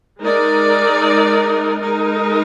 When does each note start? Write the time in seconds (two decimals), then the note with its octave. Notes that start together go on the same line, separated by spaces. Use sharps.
0.21 G#3 D#4 A#4 D5
1.79 G#3 D#4 A#4